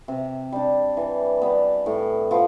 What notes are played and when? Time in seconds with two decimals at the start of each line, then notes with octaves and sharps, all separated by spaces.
0.08 C3
0.52 G3 D4
0.97 E3
1.42 G3 B3
1.86 A2
2.31 F3 B3